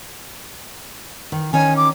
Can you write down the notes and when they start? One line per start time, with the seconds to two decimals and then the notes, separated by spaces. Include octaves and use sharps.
1.32 D#3
1.53 D#3 C#4 D#4 G#5
1.77 D6